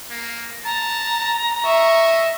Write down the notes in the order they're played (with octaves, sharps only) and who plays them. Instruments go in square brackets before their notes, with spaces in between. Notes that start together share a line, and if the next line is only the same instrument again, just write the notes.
[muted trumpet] A#3
[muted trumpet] A5 [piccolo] A#5
[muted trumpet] D#5 [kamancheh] E5 [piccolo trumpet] C#6